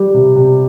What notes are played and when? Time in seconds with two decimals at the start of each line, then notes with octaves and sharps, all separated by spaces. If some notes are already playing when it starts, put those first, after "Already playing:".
Already playing: G3
0.14 C3
0.36 C3